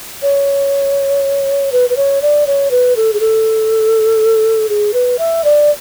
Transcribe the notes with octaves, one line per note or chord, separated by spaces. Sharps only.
C#5
B4
B4
C#5
D5
C#5
B4
A4
G#4
A4
G#4
B4
E5
D5